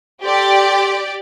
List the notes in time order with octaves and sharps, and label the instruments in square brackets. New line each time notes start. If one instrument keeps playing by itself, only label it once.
[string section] G4 D5 [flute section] A4 G5 C6